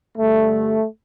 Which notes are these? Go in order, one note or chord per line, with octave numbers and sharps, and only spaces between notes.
G2 D3 G3 A3